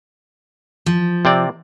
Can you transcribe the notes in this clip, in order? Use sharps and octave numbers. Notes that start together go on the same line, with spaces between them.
F3
C3 C4 D5